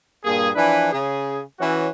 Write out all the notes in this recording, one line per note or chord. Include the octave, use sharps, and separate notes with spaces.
G2 A#2 A#3 G#4
E3 F3 D4 E4 B4 G#5
C#3 G#4
E3 C#4 F#4